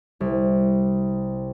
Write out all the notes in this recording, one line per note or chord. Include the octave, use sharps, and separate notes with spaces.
C2